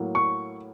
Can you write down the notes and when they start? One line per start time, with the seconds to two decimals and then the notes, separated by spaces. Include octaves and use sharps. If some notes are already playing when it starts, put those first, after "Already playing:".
Already playing: A2 F#3 A#3
0.15 C#6